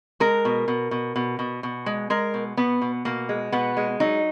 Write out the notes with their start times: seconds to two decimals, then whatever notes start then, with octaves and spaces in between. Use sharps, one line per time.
0.20 G#3 A#4
0.45 B2
0.68 B2
0.91 B2
1.16 B2
1.39 B2
1.63 B2
1.86 G#3
2.10 G#3 A#4
2.34 B2
2.57 B2 B3
2.81 B2
3.05 B2 A#3
3.29 G#3
3.52 B2 B3
3.77 G#3
4.00 F#3 D#4